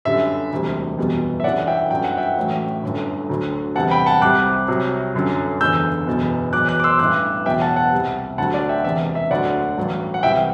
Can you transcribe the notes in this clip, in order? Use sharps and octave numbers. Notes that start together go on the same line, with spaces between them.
G1 F#2 D3 G3 E5
E1 D2 C3 G3
F#1 E2 B2 G3
E5
G1 F#2 E3 D5 F#5
E5 G5
G1 F#2 F#3 G5
F#5
E5 G5
A1 A2 F#3
G1 F#2 D3
D2 D3 F#3
E2 C3 G3 F#5 A5
G5 B5
F#5 A5
C2 C3 G3 D6 F#6
C2 C3 F#3
G1 F#2 D3 F#3
F#1 E2 D3 E6 G6
F#1 E2 B2
E2 B2 F#3 D6 F#6
D6 F#6
D6
C6 E6
A1 G2 E3 D6 F#6
E2 B2 F#3 E5 G5
F#5 A5
F#5 A5
C2 C3 G3
D2 D3 F#3 F#5 A5
D5 F#5
E5 G5
E1 E2 C3 E5
E5
D2 D3 F#3 D5 F#5
A1 G2 F#3
F#5
C2 C3 E3 E5 G5